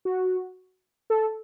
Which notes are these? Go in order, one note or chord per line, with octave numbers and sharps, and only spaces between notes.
F#4
A4